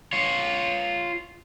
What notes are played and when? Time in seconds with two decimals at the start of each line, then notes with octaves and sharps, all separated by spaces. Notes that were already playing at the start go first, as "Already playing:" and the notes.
0.13 F4 C#5